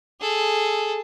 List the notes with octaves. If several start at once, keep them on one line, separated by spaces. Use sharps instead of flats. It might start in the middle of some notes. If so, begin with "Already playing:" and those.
G#4 A4